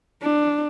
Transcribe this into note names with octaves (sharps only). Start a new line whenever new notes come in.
D4